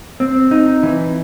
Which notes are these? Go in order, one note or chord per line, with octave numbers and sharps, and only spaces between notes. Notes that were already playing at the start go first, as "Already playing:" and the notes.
C4
D#4
E3